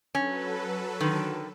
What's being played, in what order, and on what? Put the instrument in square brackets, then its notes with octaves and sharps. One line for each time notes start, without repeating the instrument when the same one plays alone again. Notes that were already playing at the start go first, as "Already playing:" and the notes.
[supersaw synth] F#3 A4 B4 [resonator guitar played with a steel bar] C#4
[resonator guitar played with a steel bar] D3 D#3